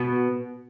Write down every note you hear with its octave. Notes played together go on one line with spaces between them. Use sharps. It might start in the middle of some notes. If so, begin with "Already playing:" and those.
Already playing: B2 B3